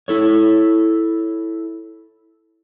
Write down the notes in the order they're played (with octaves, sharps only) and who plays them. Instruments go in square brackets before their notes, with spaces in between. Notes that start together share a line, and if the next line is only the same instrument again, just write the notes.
[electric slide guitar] E4 A4 C#5